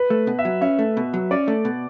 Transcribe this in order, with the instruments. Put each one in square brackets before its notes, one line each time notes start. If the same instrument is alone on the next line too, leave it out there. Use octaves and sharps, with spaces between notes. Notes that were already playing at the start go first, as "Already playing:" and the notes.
Already playing: [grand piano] B4
[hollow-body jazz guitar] A3
B2
[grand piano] E5
[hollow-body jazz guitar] F#3
[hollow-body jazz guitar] C#4 [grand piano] E5
[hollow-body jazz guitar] A3
B2
F#3
[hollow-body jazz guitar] C#4 [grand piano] D5
[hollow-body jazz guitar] A3
B2